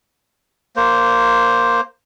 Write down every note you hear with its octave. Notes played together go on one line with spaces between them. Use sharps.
A#3 C5